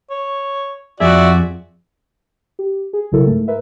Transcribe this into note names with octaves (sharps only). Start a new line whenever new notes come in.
C#5
F2 F#4 G#4 D5 E5
G4
G#4
B1 C#3 F#3 E4 A4 A#4
G#2 A3
A#4 B4 E5